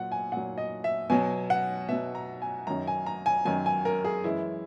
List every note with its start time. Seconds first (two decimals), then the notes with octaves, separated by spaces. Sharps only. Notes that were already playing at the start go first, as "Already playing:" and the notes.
Already playing: A#2 F#3 F#5
0.12 G#5
0.32 A#2 F#3 F#5
0.58 D#5
0.84 E5
1.10 B2 F#3 G#5
1.50 F#5
1.88 B2 F#3 E5
2.15 A#5
2.42 G#5
2.67 F#2 D#3 F#3 A#5
2.87 G#5
3.06 A#5
3.26 G#5
3.45 F#2 D#3 F#3 G#5
3.66 G#5
3.85 A#4
4.04 G#4
4.24 F#2 E3 G#3 E4